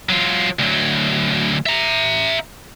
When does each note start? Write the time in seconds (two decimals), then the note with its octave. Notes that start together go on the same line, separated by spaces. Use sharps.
0.09 F#3 F4
0.59 D2 F#3
1.66 E5 A#5